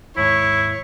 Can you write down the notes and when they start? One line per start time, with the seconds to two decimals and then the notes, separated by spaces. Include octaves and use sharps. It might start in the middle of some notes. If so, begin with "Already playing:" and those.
0.17 D#2 G#2 E4 C#5